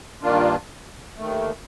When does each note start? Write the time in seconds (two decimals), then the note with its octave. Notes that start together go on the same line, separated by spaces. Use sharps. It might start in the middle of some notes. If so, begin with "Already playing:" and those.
0.23 G2 D#3 A#3 D4 F4
1.18 D#2 D#3 A3